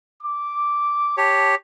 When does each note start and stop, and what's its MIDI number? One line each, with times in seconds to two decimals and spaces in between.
0.22 1.15 86
1.17 1.55 67
1.17 1.55 73
1.17 1.51 81